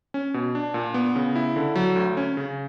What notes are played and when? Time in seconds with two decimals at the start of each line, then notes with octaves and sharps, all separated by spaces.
0.14 C#4
0.34 B2
0.55 D4
0.74 A#2
0.94 B3
1.16 C#3
1.36 E4
1.56 D3
1.76 F#3
1.96 D2
2.17 C#4
2.37 C#3